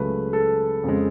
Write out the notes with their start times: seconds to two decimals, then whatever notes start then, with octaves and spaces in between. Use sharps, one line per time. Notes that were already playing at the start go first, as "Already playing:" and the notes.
Already playing: C#2 C#3 F#3 A3 B4
0.33 A4
0.84 F2 C#3 G#3